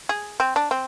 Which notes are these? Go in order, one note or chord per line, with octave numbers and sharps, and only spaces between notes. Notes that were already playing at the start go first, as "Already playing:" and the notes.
G#4
C4
D4
C4